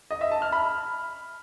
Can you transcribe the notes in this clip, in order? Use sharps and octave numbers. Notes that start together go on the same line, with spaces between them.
D#5
E5
A5
F6
B5